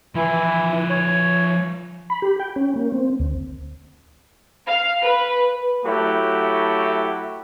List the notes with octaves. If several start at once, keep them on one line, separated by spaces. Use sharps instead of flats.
E3 F3 E4 B4
C#5
B5
G4
G5
C#4
A#3
C4
D2
F5
B4
F#3 A3 E4 F#4 G4